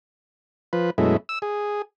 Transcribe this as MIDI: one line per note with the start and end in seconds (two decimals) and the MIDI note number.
0.73 0.90 53
0.73 0.90 71
0.98 1.17 42
0.98 1.17 47
0.98 1.17 56
0.98 1.17 57
0.98 1.17 64
1.29 1.39 88
1.42 1.82 68